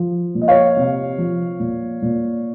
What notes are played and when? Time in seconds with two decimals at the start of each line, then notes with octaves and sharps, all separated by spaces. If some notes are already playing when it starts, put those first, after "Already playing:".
Already playing: F3
0.35 A#2
0.42 D#5
0.48 C#5 F5
0.77 C3
1.18 F3
1.60 A#2
2.02 A#2